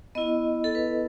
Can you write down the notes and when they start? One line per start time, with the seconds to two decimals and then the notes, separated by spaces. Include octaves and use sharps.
0.15 B3 E4 D#5
0.64 A4
0.75 B4